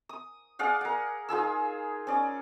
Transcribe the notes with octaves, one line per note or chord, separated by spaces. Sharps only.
D#6
G#4 D5 F5 F#5
A#4 F#5
D#4 F4 G#4 E6
C#4 D5